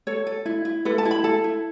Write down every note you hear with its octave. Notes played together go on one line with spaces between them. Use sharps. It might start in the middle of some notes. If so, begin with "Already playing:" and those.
A4 C#5
A4
E4
E4
A4 B4
A5
E4
B5
A4 A5
E4